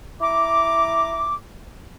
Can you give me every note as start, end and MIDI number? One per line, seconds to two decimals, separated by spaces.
0.20 1.33 64
0.20 1.33 82
0.20 1.33 86